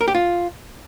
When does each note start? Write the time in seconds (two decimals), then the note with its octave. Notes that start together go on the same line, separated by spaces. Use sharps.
0.01 A#4
0.08 G4
0.15 F4